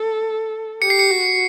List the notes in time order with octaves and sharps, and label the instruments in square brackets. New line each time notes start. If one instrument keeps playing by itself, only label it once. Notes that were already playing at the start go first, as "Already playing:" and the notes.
Already playing: [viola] A4
[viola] G4 [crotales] C#7
[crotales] C7
C#7
[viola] F#4